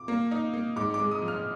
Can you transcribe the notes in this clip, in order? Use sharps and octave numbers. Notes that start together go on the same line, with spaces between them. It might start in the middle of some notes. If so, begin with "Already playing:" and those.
Already playing: D6
A#3
D#4
A#3
G#2 D6
D6
G#3
D#6
F3
F6